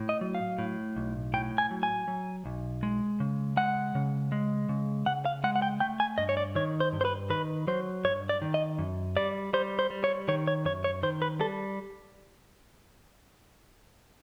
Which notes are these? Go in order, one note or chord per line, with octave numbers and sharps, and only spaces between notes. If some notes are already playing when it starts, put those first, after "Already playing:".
Already playing: A2
D#5
F#3
F5
A2
B1
A2 G5
G#5
F#3
G#5
F#3
B1
G#3
C#3
G#3 F#5
C#3
G#3
C#3
C#3 F#5
F5
G#3 F#5
F#5
G5
A3 G5
G#5
G2 D#5
C#5
D5
D#3 C#5
C5
G2
C5
B4
D#3 B4
F#3 C5
G2 C#5
D5
D#3
D#5
F#2
G3 D5
G3 C5
C5
G3
C#5
D#3 C#5
C#5
F#2 C#5
C#5
D#3 C5
B4
G3 A4